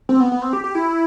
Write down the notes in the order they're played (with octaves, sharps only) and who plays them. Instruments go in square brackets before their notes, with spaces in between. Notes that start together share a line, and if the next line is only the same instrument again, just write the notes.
[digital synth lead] C4
B3
B3
C4
G4
G4
E4